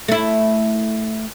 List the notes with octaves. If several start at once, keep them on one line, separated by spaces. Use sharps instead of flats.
A3 E4